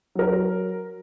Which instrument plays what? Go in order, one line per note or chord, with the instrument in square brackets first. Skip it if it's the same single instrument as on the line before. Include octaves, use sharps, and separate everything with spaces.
[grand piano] F#3 A#4